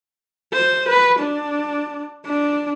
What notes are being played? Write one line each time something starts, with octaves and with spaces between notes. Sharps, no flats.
C5
B4
D4
D4